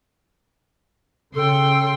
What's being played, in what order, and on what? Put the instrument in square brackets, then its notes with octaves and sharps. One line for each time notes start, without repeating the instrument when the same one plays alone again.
[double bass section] C#3 [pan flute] A4 [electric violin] G5 C6